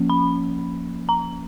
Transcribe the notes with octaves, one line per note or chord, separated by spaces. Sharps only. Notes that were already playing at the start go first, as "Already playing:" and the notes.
Already playing: F3 A#3 C#4
B5
A#5